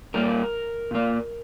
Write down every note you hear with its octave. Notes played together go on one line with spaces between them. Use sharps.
A#2 G3 A#3 A#4
A#2 A#3